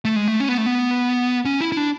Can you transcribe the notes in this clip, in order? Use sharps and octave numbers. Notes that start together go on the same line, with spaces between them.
A3
G#3
A3
C#4
B3
A3
B3
C#4
E4
E4
D4